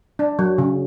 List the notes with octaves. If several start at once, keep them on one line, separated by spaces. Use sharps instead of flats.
D4
F#3
C#3